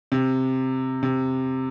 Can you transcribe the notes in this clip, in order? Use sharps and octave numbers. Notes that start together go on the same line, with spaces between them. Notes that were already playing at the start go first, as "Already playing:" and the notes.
C3
C3